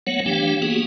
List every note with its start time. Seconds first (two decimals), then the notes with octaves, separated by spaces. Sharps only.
0.07 F#3 A3 B3 C#5 F#5
0.26 E3 A3 D4 G4 F5 G5
0.62 A#3 B3 F#4 G#4